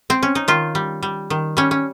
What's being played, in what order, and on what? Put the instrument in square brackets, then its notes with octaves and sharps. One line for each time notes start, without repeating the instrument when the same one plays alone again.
[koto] C4
C#4
D#4
D#3 F4
G3
G3
D#3
G3 C#4
C#4